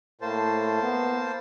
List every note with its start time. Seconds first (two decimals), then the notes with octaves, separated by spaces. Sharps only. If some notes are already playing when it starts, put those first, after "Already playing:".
0.21 A2 A#3 C5 A5
0.82 B3